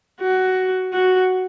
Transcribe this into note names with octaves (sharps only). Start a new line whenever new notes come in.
F#4
F#4